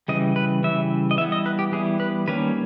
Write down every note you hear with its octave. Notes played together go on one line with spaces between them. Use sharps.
C#3 E3 G3 D#5
B4
C#3 E3 G3 E5
D#5
E3 G3 B3 E4 E5
D#5
B4
G4
E3 G3 B3 E4 G#4
B4
D#3 G3 A#3 C#4 B4